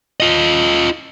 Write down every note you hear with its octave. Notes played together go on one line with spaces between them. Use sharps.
F4 D#5